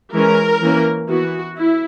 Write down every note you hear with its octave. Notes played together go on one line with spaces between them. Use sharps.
E3 G#3 C#4 A#4
E3 A#3 C#4
E3 B3 F#4
E4